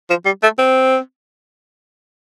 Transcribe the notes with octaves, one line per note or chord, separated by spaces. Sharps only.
F3
G3
A3
C4